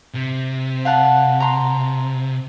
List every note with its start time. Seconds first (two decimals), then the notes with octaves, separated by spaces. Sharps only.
0.14 C3
0.85 F5 F#5 A5
1.40 A#5 C6